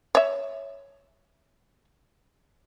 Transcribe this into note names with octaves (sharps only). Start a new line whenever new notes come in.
C#5 E5